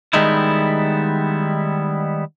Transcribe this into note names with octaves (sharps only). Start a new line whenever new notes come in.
D#3 G3 G#3 B3 D#4 E4